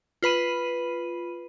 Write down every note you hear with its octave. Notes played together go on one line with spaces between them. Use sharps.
F4 B4 B5 D#7